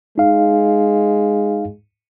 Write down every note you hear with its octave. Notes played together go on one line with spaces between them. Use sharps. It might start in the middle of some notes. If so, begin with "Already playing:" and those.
G#3 D#4 F5